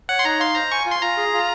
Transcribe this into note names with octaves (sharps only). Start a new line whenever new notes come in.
C#5 F#5
C6
D#4 A#5
F5 C6
C5 A#5
G#5 C#6
F4
C6
F4 A#5
G#4
F4